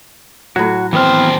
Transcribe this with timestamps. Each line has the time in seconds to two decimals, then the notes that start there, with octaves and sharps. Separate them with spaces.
0.56 A2 F#3 F#4
0.93 D#2 E3 B3 C4 C5 F6